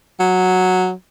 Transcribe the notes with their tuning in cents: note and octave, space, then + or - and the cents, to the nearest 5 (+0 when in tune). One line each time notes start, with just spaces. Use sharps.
F#3 -5